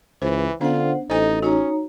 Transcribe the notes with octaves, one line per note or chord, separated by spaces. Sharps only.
C#2 E3 C5
D3 B3 C#4 D4 F4 C5 F#5
A1 D#4 A4 C5 D#5 G#5
C#4 D#4 F#4 C#5 A#5